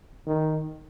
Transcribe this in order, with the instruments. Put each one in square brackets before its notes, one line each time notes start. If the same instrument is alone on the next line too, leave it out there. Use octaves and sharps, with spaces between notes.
[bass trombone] D#3